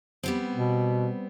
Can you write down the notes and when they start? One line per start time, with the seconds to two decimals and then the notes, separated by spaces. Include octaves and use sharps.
0.23 G3 B3 C4
0.54 B2